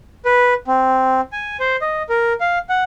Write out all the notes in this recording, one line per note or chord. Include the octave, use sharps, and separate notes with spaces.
B4
C4
G#5
C5
D#5
A#4
F5
F#5